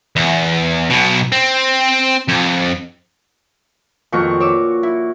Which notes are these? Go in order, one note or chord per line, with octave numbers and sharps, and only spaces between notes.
E2
B1 B2
C4
F2
F2 A#2 D#3 F#4 C#6
C#5 D6 E6
E4